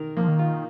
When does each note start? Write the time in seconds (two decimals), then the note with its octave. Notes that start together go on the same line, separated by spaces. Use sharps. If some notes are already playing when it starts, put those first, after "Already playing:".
Already playing: D#3 A#4
0.17 F3 A#3
0.28 D#3
0.39 F4